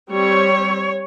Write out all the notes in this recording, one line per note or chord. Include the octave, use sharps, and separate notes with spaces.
G3 C4 C#5